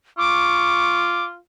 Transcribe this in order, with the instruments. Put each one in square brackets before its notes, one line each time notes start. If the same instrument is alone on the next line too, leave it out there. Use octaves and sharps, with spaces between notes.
[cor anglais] F4 [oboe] C#6 [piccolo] D6